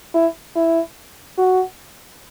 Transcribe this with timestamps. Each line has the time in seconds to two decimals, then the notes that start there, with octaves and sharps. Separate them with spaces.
0.14 E4
0.56 E4
1.38 F#4